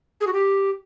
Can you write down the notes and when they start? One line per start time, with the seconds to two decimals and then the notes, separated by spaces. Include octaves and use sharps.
0.21 G#4
0.27 F#4
0.33 G4